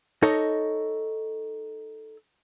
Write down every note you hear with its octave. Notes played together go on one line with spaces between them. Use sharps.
D#4 A4 C#5 D#5